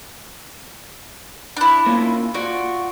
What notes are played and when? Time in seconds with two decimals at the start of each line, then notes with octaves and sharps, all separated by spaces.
1.57 D4 E4
1.86 A#3 C#4 F4
2.34 F4 F#4 D5